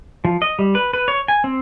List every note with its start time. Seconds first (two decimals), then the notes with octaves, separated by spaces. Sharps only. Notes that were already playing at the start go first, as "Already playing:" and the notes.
0.25 F3
0.42 D#5
0.59 G3
0.75 B4
0.93 B4
1.08 C#5
1.28 G#5
1.44 C4